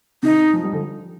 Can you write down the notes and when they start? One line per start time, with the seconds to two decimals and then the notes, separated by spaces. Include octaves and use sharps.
0.23 C3 D#3 D#4
0.53 F3
0.63 G3
0.73 D3 F3